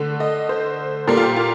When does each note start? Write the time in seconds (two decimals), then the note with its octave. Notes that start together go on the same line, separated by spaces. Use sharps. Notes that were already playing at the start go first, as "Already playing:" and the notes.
Already playing: D3 A3
0.20 D#5
0.49 C5
1.08 A#2 G3 A#3 A4
1.17 F4
1.22 G4
1.36 F4